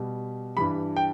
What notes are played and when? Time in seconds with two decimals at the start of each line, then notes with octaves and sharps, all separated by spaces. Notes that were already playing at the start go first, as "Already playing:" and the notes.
Already playing: B2 G3
0.57 G2 E3 G3 B5
0.97 G5